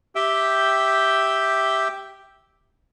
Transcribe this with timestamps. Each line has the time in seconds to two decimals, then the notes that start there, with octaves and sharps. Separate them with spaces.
0.15 G4 E5 G5